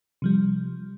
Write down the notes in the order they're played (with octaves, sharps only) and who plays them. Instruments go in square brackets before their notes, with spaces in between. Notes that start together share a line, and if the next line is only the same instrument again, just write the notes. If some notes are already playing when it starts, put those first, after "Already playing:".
[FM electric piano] C3 F3 G3